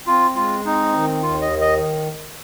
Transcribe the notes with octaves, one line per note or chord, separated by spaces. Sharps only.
C4 F4
G#3 F4
C4 D#4
D#3
D#2 F4
D#5
D#3
D#5